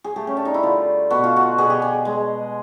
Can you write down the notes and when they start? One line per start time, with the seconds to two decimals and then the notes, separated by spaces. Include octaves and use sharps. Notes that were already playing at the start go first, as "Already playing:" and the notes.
0.04 G#4
0.16 A3 G4
0.27 C#4
0.37 D4
0.45 D#4
0.54 E4
0.63 D3 F4
1.10 B2 F#4
1.24 F4
1.36 F#4
1.58 B2 G#4
1.70 G4
1.82 G#4
2.05 G#3